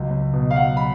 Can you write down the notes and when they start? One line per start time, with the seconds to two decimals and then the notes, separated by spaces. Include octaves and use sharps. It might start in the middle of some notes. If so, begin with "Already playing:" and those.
Already playing: C#2 F#3
0.11 C#2
0.33 B2
0.51 F5
0.56 F#3 F#5
0.77 B5